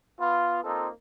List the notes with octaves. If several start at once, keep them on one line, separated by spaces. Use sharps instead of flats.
B3 F4
A#3 C4 D#4 F4 A4